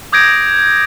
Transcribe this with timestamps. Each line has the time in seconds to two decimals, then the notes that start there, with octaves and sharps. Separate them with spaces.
0.12 D6 D#6 G6 G#6 A#6 D7